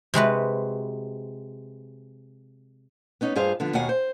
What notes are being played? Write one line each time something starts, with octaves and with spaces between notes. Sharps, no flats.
C3 G#3 F#4 B4
B3 C#4 D#4
G2 F4 G#4 C5 F5
D3 F3 B3
D#2 B2 D#3 F5 F#5 G#5
C5